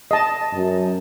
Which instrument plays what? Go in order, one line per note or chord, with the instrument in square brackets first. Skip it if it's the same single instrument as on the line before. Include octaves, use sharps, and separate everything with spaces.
[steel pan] D#5 A5
[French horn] F#2